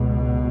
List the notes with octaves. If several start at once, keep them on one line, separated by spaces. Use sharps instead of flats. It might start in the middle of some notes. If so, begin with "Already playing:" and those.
Already playing: C#2 B2